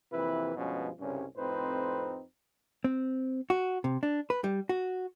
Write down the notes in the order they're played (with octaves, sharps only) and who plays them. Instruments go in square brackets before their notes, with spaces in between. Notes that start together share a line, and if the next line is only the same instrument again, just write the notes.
[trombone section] F2 C3 E3 A#3 E4 B4
G2 B2 F3 G#3 C#4
C2 G2 C#3 C#4
F2 A2 C4 D#4 B4 C5
[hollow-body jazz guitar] C4
F#4
C3
D4
B4
G3
F#4